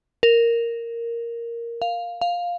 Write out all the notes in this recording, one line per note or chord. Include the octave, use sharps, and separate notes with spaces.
A#4
F5
F5